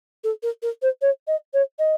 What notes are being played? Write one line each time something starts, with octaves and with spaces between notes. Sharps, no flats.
A4
A#4
A#4
C5
C#5
D#5
C#5
D#5